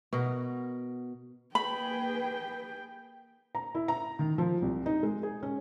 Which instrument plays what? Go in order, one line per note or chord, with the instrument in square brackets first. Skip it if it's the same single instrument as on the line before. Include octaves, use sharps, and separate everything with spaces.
[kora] B2 F#4 A#4
[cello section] A#3 G#4 B4 [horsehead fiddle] G5 [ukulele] B5
[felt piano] A#5
E4
A#5
D#3
F3
C2
D#4
G#3
G#4
C#4